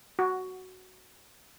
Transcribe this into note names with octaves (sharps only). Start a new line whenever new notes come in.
F#4